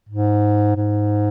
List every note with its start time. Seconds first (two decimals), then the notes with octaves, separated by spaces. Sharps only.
0.09 G#2
0.76 G#2